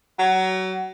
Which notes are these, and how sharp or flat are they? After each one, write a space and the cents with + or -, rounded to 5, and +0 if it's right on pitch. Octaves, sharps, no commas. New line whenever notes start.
F#3 +25